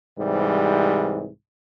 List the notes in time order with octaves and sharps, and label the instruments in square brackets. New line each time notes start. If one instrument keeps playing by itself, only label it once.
[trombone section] C2 G#2 E3 G3